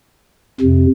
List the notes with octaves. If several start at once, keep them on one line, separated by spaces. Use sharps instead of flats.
F2 C3